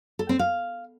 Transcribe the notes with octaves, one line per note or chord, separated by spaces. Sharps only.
A4
C4
F5